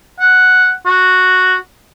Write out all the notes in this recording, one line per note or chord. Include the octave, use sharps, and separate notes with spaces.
F#5
F#4